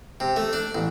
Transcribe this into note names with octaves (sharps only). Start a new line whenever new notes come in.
C3
A3
D4
A1